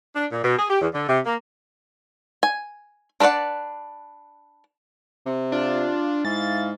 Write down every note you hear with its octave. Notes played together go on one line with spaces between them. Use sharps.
D4
A#2
B2
G#4
G4
E2
D3
C3
A#3
G#5
D4 A#4 B4 D5 F#5
C3
D4 F4
G#2 E4 F5 A6